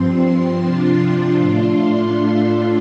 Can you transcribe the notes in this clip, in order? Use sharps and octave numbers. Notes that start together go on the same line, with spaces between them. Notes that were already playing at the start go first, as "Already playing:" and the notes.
Already playing: G2 F3 C4 C6
C3 F3 D4 F4
A2 A3 D4 F4